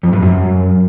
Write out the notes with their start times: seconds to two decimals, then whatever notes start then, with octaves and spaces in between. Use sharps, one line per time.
0.03 F2
0.13 G2
0.22 F#2